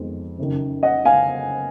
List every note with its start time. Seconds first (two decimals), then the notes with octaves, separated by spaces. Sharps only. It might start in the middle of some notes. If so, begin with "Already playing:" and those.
Already playing: F2 D#3 G#3 B3
0.38 F#1 F#2 D#3
0.83 D#5 F#5
1.05 F5 G#5